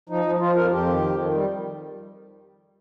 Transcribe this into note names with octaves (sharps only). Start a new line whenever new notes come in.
F3 D#4
F3
F3 F4
F2 A#4
F2 G4
D#3
F2
D#3
G3